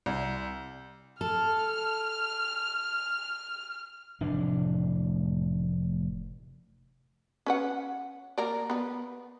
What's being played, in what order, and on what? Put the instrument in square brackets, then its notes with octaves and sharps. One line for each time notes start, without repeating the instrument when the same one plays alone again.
[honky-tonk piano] C2
[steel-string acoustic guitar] A4 [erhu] F6
[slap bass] F1 A2 E3 D4
[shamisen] C#4 B4 F#5
A#3 A#4 D5
B3 B4